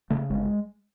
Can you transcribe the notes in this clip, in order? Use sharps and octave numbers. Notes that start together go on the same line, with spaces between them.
C#3 A3
G1 G#3